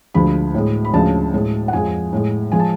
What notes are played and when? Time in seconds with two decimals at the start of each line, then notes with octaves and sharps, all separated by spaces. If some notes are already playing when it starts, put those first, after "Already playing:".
0.14 D2 D3 F3 G#3 B5
0.54 A2 G#3
0.84 B5
0.93 D2 C#3 F3 G#3 A5
1.33 A2 G#3
1.68 F#5
1.73 F2 F3 G#3 G#5
2.13 A2 G#3
2.52 F3 G#3 G#5
2.59 A5